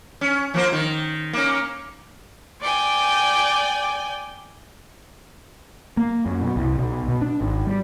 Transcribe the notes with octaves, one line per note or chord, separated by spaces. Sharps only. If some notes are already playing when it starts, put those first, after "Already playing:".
C#4
F3 A#3 C5
D#3
A#3 C#4
D5 G5 G#5
A#3
F#2
B2
C2
B1
B2
D4
G#1
G3